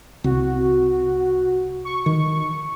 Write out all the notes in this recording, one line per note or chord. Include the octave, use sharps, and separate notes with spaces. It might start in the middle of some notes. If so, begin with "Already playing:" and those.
C2 F#4
C#6
D#3